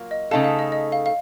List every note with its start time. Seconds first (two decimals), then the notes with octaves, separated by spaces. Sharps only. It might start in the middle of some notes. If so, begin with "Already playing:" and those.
Already playing: F#3 A#3 F4
0.11 D#5
0.31 C#3 A3 D#4 A4 F5 A5
0.44 F5
0.59 D#5
0.72 D#5
0.92 F5
1.06 F5